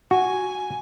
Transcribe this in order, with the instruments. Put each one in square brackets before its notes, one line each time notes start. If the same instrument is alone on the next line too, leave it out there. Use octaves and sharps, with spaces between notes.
[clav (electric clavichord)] F#4 [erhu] G#5